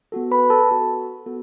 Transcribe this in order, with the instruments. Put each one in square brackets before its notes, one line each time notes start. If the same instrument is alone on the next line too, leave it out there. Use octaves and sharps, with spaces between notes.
[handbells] B3 F#4 A4
B4 B5
A4 A5
B3 F#4 A4
B3 F#4 A4